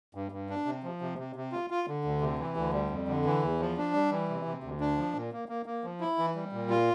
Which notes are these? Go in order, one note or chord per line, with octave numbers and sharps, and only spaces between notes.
G2
G2
D4
C3
F3
C3
C3
C3
F4
F4
D3
D2
C3
E3
D2
G3
F2
D3
E3
E2
F3
D4
G3
E3
C3
C3
D2
D4
F3
A#2
A#3
A#3
A#3
F3
E4
E3
G3
A#2
F4